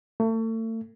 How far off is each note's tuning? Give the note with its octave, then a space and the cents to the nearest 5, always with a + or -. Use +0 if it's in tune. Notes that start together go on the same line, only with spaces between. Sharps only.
A3 +35